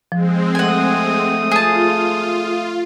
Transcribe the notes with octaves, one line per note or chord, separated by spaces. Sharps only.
F3 G#3 C4
A3 F#5 G#5 D#6
F4 G#4 A5